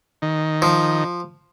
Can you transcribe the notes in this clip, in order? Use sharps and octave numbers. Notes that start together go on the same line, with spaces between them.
D#3
F3